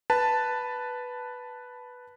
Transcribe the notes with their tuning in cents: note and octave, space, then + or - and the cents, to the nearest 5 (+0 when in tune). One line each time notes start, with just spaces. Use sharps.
B4 +0 A5 +5